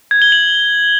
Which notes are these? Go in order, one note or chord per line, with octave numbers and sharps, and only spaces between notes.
G#6
G7
F#7